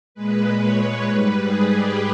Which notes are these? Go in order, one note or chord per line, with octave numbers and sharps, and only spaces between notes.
A#2 G#3 B4
C#5
G#2 G3 B4
G#4
G4